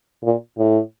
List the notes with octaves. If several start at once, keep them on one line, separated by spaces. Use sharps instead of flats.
A#2
A2